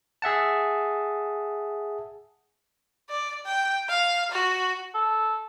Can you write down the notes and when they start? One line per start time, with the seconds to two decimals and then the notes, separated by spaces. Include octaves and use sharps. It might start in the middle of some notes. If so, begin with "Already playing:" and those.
0.22 G#4 E5 F#5 A5
3.10 D5
3.46 G5
3.89 F5
4.32 F#4
4.94 A4